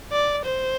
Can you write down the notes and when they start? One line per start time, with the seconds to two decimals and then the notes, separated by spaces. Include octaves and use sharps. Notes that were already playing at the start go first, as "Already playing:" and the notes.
0.12 D5
0.45 C5